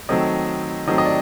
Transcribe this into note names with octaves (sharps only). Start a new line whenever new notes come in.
D#3 F#3 A3 C4 D#5
D#3 F#3 A3 C4 D#5
D#5
D5